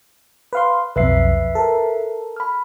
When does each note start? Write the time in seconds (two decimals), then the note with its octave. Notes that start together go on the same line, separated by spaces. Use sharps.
0.53 B4 F5 C6
0.96 B1 F2 B4 E5 C7
1.55 A4 A#4
2.36 B5 F6